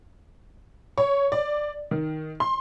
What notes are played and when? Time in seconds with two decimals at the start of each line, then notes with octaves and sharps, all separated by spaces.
0.98 C#5
1.32 D5
1.91 D#3
2.40 C6